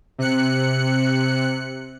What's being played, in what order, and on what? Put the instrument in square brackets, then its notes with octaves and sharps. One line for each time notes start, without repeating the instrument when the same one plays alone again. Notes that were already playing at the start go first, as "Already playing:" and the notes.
[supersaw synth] C3 F#6 C#7